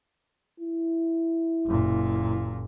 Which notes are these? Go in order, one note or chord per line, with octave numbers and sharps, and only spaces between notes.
E4
F#1 A#2